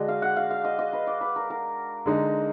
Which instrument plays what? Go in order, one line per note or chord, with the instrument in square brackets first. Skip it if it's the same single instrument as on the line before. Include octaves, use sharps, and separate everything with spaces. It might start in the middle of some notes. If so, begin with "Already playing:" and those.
Already playing: [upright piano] D3 G#3 D4 F#4 [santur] D#5
[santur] F5
F#5
F5
F5
D#5
D#5
B4
D5
B4
A#4
A#4
[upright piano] D3 G#3 D#4